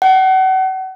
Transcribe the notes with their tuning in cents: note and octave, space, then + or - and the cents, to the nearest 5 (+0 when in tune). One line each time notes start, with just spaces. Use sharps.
F#5 +35